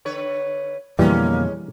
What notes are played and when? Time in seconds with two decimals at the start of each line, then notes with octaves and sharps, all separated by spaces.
0.05 D3 B4 C#5
0.99 F2 B2 D3 E3 G3 G#3 A#3 C#4